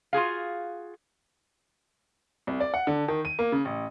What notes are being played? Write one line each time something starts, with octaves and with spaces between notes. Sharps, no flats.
F4 F#4 G#4 F5
C2
D5
F#5
D3
D#3
D#7
A#3
C#3
A1